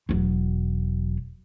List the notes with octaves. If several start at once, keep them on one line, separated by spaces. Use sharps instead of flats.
E1 F#3